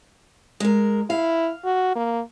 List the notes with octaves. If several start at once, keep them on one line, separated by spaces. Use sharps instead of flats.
G#3 A#4
E4 F5
F#4
A#3